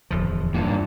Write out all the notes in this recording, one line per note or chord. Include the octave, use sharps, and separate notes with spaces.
D1 E2 F3
G2 A#2